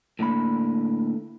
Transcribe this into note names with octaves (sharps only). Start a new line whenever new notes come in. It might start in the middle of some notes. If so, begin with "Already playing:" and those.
A2 D3 A#3 B5